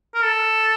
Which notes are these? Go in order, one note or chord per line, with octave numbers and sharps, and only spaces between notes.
A#4
A4